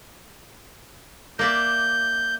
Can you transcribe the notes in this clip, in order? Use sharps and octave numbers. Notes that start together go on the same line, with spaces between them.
A#3 D5 E5 G6